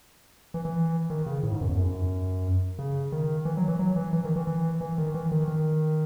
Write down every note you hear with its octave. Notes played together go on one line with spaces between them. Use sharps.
E3
E3
D#3
C#3
A2
G#2
F#2
E2
F#2
C#3
D#3
E3
F#3
E3
F#3
E3
E3
D#3
E3
E3
E3
D#3
E3
D#3
D#3